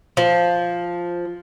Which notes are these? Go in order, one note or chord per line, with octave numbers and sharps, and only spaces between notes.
F3